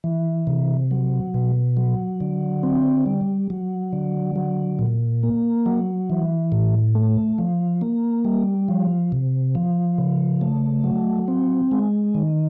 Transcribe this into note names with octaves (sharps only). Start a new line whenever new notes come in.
E3
C3
F#3
B2
F#3
D3
C4
G3
F#3
D3
F#3
A#2
A#3
F#3
E3
A2
A3
F3
A#3
G3
F3
C3
F3
C#3
A3
F#3
C4
G#3
D#3